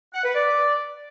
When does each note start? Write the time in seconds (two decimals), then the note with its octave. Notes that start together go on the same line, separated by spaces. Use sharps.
0.14 F#5
0.24 B4
0.35 D5